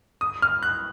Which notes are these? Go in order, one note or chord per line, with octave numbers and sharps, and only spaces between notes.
D#6
F6
F#6